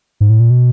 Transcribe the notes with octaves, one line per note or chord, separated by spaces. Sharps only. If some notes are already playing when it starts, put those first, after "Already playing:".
G#2
A2
A#2
B2